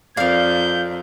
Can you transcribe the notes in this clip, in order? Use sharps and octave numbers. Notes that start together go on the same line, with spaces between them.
F2 A#4 D5 F5 G6